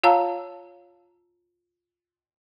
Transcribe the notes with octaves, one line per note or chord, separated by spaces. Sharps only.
F4 C#5 F5 A5 A#5 E6